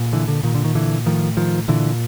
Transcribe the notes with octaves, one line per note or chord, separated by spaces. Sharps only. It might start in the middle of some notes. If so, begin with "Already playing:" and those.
Already playing: A#2
D3 E3
D3
A#2 D#3
D3
D#3
D3 E3
A2 D#3 F3
D#3 F3
A#2 D3 E3